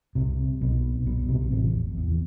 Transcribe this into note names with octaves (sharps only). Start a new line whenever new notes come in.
C2 C3
B1 B2
B1 B2
C2 C3
A1 A2
F2
E2